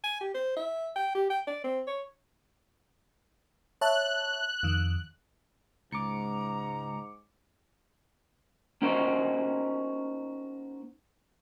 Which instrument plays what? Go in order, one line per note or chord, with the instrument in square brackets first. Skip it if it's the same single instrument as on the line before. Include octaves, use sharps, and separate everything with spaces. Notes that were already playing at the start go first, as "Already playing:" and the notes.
[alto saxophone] G#5
G4
C5
E5
G5
G4
G5
D5
C4
C#5
[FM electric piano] C#5 E5 A5 [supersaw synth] F#6
[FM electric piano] F2 D#3
[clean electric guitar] C#2 [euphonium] G#2 [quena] A#5 [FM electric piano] D6 C#7
[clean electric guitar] A#3 C#4 D#4 F#4 B4 C5